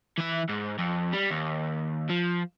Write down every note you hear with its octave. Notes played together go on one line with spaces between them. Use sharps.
E3 E5
G#2
F2
G3
D#2
F3